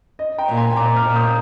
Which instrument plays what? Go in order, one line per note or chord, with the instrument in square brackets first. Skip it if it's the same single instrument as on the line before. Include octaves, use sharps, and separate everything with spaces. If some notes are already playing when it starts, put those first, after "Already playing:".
[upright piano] D#5
G5 A#5
[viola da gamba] A#2
[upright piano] G#5 C6
[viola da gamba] A#2 [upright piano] A#5 D6
[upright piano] D6 F6
[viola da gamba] A#2
[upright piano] D#6 G6